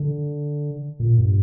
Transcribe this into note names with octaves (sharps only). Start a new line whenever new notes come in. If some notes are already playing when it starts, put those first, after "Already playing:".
Already playing: D3
A#2
G2